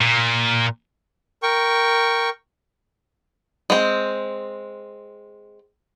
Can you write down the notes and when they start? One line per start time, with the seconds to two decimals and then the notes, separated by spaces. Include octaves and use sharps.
0.01 A#2
1.43 A#4 G5 C#6
3.70 G#3 C4